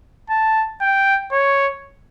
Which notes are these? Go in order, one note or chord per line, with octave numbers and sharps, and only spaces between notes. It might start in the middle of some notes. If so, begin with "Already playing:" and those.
A5
G5
C#5